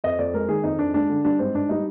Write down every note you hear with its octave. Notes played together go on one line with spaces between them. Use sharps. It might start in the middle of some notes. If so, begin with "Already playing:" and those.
F2 D#5
F2 D5
G#3 A#4
D#3 G#4
F2 D#4
F2 D4
G#3 D4
D3
G3 D4
G#2 C4
G#2 D4
G3 D#4